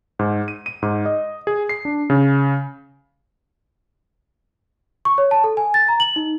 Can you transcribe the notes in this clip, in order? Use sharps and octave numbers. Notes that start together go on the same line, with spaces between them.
G#2
D#7
D#7
G#2
D#5
G#4
C7
D4
C#3
C#6
C#5
A5
A4
G#5
A6
A#5
F#7
D#4